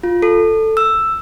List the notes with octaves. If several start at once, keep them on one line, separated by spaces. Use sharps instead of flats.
F4
A4
E6